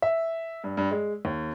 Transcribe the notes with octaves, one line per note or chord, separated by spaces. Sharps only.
E5
G2
G2
G#3
D#2